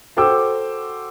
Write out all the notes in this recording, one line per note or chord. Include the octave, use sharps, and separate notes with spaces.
F#4 A4 C5 G5 D6 E6